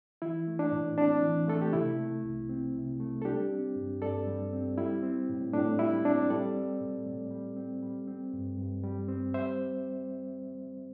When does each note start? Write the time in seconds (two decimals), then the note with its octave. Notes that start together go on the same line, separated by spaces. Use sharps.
0.22 E3 E4
0.47 A3
0.59 D4
0.72 A2
0.98 C4 D4
1.23 E3
1.48 A3 A4
1.62 G4
1.73 C3 E4
2.00 A3
2.24 C2
2.49 C4
2.75 C3
3.00 A3
3.22 A4
3.25 G3 D4 G4
3.51 C4
3.76 G2
4.02 G2 A4 D5
4.27 G3
4.53 C4
4.78 G3 E4
5.03 C4
5.29 A2
5.53 A2 D4
5.79 G3 E4
6.05 C4 D4
6.30 G3 A4 D5
6.56 C4
6.81 A2
7.06 A2
7.31 G3
7.56 C4
7.83 G3
8.08 C4
8.33 G2
8.58 G2
8.84 G3
9.08 C4
9.34 G3 C5 E5